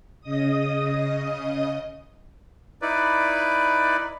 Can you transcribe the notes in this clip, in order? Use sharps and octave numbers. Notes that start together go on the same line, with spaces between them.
C#3 D#5 D#6
D#4 E4 B4 D5